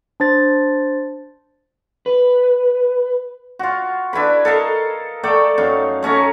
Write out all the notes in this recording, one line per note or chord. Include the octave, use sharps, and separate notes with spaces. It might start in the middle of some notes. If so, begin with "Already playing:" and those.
D4 C5 A6
B4
F4 F#4
D4 E4 B4 B5
A4 A#4 D#5 F5
A3 A4 D5 G5
F#2 D#4 F5
A3 C#4 C#5 A#5